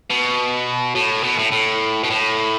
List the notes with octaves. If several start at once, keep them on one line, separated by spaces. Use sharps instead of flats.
B2
A2
B2
A2
A2
B2
A2